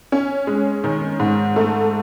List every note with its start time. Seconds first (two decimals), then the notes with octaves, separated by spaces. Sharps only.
0.12 C#4
0.47 G#3
0.84 D#3
1.20 G#2
1.56 A3